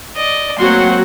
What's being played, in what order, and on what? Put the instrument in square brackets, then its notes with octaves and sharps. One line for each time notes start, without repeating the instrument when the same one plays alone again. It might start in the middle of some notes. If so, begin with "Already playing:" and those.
[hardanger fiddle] D5 D#5
[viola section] F#3 C4 F#5 [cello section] A3 A#3 [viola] F#4 [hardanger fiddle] C6